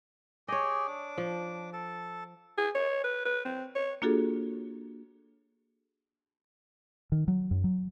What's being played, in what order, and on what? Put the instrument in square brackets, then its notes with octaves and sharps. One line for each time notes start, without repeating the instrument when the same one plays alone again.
[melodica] G4 G#4 G5 [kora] C#5 D#5
[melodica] D4 D6
[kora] F3
[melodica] A4 A5
[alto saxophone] G#4
C#5
B4
B4
C4
C#5
[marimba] A#3 D4 F4 F#4 G#4 A4
[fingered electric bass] D#3
F#3
F#2
F#3